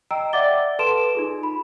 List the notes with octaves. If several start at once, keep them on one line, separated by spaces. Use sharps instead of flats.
D#5 G5 A#5 E6 D7
D5 E5 F#5 D6 A6 G7
A4 B4 A5 C6 D7 E7
D#4 F4 G#4
B5